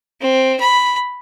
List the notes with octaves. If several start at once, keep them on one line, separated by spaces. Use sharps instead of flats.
C4
B5